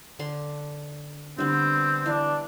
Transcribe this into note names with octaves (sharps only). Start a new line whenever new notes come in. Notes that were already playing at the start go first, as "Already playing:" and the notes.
D3 D4 C6
D3 G3 B3 C4
E3 D4 F5